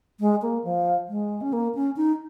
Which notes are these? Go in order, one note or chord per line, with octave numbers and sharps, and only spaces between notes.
G#3
A#3
F3
G#3
C#4
A#3
C#4
D#4